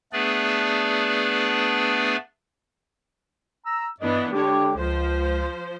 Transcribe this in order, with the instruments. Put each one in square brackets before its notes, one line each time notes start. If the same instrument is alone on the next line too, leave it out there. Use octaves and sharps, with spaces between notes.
[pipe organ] A3 B3 D4 G#4 B4 D5
[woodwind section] A#5 E6
[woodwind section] G2 D#5 [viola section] E3 B3 D4
[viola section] D3 G#3 C#5 [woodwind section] D4 G4
[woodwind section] C#2 [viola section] F3 C5